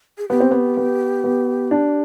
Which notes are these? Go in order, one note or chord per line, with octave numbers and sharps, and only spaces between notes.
G#4
B3 G4
C4
B3
B3
B3
D4